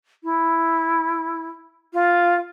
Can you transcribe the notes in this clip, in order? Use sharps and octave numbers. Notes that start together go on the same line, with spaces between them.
E4
F4